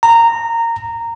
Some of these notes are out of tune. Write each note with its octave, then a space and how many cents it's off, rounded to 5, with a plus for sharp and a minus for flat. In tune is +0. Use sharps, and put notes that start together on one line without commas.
A#5 -15